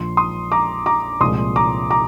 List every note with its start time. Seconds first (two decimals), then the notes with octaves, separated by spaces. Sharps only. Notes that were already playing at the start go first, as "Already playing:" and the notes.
Already playing: A#1 A#2 F3 C6
0.17 C6 D#6
0.52 A#5 D6
0.86 A#5 D6
1.20 C2 A#2 F3 G#3 C6 D#6
1.56 A#5 D6
1.90 A#5 D6